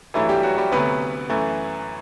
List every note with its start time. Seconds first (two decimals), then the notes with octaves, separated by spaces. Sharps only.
0.14 G2 E3 F#3 A3 E4
0.29 G3 G4
0.43 F#3 F#4
0.58 G3 G4
0.72 D2 C3 F#3 A3 B3 B4
1.30 F#2 E3 A3